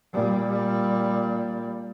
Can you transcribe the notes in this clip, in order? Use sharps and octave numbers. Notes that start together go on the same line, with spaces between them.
A#2 G3